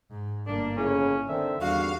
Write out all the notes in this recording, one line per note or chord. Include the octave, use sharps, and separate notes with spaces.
G#2
G1 A#3 D4
F2 A2 C#3 C#4
D3 D#3 C4 E5
G#1 E2 D3 G3 F#4 F5